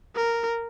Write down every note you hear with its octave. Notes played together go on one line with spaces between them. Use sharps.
A#4